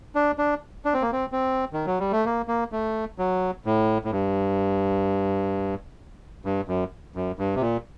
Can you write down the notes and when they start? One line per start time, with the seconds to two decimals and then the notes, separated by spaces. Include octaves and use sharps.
0.15 D4
0.38 D4
0.85 D4
0.94 C4
1.02 A#3
1.12 C4
1.32 C4
1.73 D#3
1.86 F#3
1.99 G3
2.12 A3
2.25 A#3
2.48 A#3
2.72 A3
3.18 F#3
3.65 A2
4.04 A2
4.11 G2
6.45 G2
6.68 F#2
7.15 F#2
7.39 G2
7.55 C3
7.61 A#2